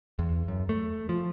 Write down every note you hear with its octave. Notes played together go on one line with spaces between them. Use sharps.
E2
F#2
A3
F3